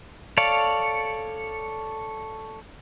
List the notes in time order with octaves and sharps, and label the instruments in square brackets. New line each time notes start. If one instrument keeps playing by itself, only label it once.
[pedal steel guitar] A4 C#5 D5 F5